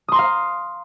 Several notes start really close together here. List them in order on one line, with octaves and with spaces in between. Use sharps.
D#6 C6 A#5 F5